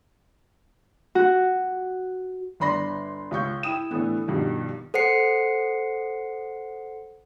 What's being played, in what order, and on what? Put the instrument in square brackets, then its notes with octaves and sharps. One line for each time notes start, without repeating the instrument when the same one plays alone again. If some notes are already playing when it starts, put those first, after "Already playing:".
[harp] F#4
[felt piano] G1 D4 B5 C6 A#6
C#2 F4 C#6 G6
E4 G5 D#6 E7
A2 D3 E3 A3 B3
G2 B2 D#3 F3
[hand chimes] A4 C5 F#5 C7 C#7